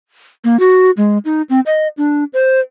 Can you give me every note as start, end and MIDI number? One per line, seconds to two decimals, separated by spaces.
0.44 0.59 58
0.60 0.91 66
0.97 1.18 56
1.25 1.42 63
1.50 1.60 60
1.66 1.88 75
1.97 2.24 62
2.33 2.60 72